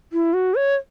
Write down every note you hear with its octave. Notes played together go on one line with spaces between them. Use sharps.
E4
F#4
C#5